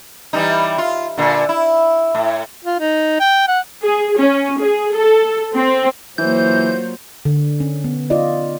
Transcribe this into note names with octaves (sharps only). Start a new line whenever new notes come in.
E3 G3 D#4
F4
A#2 D3
E4
A2
F4
D#4
G5
F#5
G#4
C#4
G#4
A4
C4
E3 F#3 A#3 F4 C5 G6
D3
C#4
B3
F4 D5 D#5